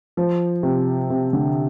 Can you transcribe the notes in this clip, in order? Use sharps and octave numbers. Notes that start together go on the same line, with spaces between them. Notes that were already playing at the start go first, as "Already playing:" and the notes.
F3
C3
C3
D3